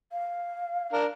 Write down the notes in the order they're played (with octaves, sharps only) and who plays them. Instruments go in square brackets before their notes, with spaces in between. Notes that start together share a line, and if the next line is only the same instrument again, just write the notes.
[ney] F5
[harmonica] D4 A#4